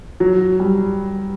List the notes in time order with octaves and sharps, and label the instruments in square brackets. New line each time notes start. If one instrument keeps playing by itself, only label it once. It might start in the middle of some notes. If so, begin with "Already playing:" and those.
[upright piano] F#3
G3